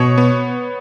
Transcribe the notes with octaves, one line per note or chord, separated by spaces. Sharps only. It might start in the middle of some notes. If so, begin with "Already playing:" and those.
Already playing: B2 C#5
B3